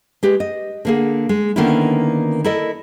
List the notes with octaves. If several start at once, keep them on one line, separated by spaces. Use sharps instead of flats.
G#3 G4 B4
D#5
D3 A#3 G#4
G#3
D3 D#3 A#3 B3 C#4 E4
E4 A4 A#4 D5 D#5